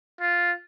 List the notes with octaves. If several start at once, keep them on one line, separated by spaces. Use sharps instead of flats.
F4